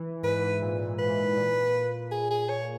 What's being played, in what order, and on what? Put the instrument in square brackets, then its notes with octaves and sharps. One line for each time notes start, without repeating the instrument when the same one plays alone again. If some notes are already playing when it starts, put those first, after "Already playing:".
Already playing: [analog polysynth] E3
[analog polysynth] G#2 [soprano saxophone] B4
[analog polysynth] A#2
A#2
[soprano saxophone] B4
[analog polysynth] G#2
A#2
A#2
[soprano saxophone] G#4
G#4
C#5